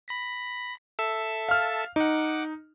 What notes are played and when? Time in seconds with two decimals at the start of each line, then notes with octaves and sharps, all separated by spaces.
0.08 B5 A#6 B6
0.99 A4 E5 A5
1.49 F5 F6
1.96 D#4 F#5 D6